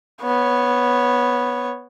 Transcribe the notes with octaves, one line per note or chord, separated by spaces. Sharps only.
B3 C#5